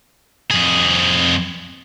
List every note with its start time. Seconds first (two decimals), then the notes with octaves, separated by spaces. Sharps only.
0.51 F2 G#4